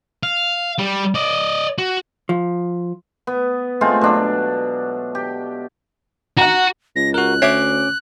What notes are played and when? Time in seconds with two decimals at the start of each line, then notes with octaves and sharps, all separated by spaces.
0.23 F5
0.78 G3
1.15 D5 D#5
1.78 F#4
2.29 F3
3.27 B3
3.81 G#3 A3 C4 F4
4.01 B2 F#3 D4
5.15 G4
6.38 F#4 F#5 A#5
6.96 C#2 A#6
7.14 F#4 A#4 F#6
7.42 D2 C#4 C#5 E5 D6